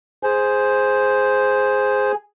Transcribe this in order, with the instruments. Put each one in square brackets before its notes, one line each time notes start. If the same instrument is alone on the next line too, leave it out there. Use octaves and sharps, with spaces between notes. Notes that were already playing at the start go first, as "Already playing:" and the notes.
[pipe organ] G#4 [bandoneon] C5